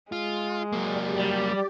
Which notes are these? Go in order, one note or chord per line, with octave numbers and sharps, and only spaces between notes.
G#3 F4
F#3 A#3 G4 D5
G3